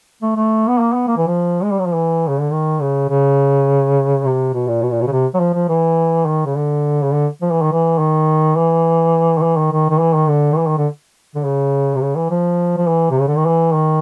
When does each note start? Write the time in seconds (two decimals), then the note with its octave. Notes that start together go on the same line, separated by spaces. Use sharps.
0.22 A3
0.36 A3
0.68 B3
0.79 A#3
0.93 B3
1.08 A#3
1.17 E3
1.27 F3
1.63 G#3
1.71 G3
1.79 F#3
1.86 F3
1.94 E3
2.28 C#3
2.40 D3
2.52 D#3
2.81 C#3
3.09 C#3
4.25 C3
4.54 B2
4.68 A#2
4.82 B2
4.91 A#2
5.01 B2
5.07 C#3
5.12 C3
5.34 F#3
5.40 F3
5.54 F3
5.69 E3
6.26 D#3
6.46 C#3
6.56 D3
7.02 C#3
7.12 D3
7.42 F3
7.51 E3
7.62 D#3
7.72 E3
7.98 D#3
8.56 E3
9.38 D#3
9.43 E3
9.57 D#3
9.72 D#3
9.90 D#3
10.00 E3
10.15 D#3
10.29 D3
10.53 D#3
10.58 E3
10.68 D#3
10.78 D3
11.35 D3
11.44 C#3
11.95 C3
12.01 C#3
12.16 E3
12.31 F3
12.78 F3
12.87 E3
13.11 C3
13.20 C#3
13.28 D3
13.37 D#3
13.46 E3
13.74 D#3